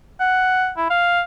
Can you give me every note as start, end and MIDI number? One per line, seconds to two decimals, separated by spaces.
0.20 0.71 78
0.77 0.88 64
0.90 1.21 77